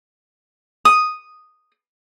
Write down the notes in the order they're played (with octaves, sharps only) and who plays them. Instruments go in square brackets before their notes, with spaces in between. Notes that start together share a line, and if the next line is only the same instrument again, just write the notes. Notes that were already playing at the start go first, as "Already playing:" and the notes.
[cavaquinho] D#6